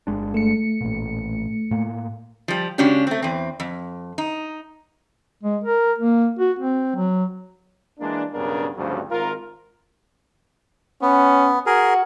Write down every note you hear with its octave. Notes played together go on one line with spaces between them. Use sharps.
G1 G#3 D4
A3 C#7
A1 A#2
A2 A#3
F3 G3
C#3 G#3 C#4 D4 F#4 G4
A3 C4
E2 C4
F2
D#4
G#3
A#4
A#3
F#4
C4
F#3
E3 G#3 A#3 D4
B1 G2 C#3 B3 D4 A#4
D2 G2 C#3 F3 F#3 C4
G#1 F4 A#4
B3 C#4
F#4 G#4 A#4